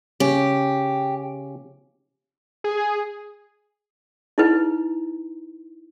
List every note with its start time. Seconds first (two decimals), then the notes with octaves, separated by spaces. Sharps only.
0.20 C#3 C#4 G4
2.64 G#4
4.38 D#4 E4 B4